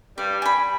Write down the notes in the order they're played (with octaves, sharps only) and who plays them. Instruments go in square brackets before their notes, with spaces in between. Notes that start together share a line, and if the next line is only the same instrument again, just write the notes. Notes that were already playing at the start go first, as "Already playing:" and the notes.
[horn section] G2 G3 [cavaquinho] D5
[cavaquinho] G#5 B5